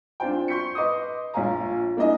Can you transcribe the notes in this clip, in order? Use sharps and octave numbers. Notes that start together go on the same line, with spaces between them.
C4 D4 F4 C5 G5
C6 C#6 G6 B6 C#7
B4 D#5 C6 D6 D#6
A#1 A#2 C#5 F5 G#5 A#5
A#3 D4 E4 D#5 G#5